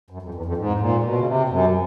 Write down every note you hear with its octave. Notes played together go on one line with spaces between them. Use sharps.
F#2
F2
E2
F2
G#2
A#2
B2
C#3
C3
F#2